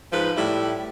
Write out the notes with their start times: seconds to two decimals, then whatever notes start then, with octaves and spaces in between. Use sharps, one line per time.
0.12 G#2 F3 B4
0.37 A2 G3 E4